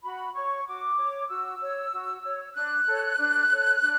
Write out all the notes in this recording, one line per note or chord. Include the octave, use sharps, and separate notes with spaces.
F#4 B5
C#5 C#6
F#4 D6
C#5
F#4 E6
C#5
F#4
C#5
D4 F#6
A4 C#5
D4
A4 C#5
D4